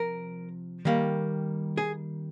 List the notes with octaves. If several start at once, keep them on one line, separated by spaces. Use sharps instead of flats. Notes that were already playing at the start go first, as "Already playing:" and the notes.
Already playing: C3 F3 A#4
D#3 G3 A#3
G#4